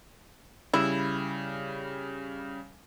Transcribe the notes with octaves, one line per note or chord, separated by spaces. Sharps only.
C#3 G3 E4